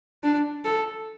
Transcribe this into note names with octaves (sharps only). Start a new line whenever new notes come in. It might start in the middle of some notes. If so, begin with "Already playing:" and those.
D4
A4